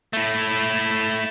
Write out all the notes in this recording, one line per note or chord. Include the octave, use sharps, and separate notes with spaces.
A3 E4